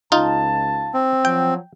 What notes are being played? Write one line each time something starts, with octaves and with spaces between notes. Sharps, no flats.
C#2 D#4 F4 F5 A5
C4
F3 F#3 G5